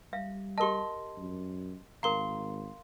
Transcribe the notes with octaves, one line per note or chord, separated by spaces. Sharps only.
G3 E5 F5
G4 A#4 D#5 A5 C6
F#2
G#1 A#4 F5 A#5 C6